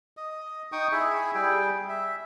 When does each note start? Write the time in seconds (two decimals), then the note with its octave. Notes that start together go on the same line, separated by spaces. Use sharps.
0.17 D#5
0.72 D#4 G5 C#6 D#6
0.92 E4 G#4 E5
1.35 G3 G#4 G5
1.89 E5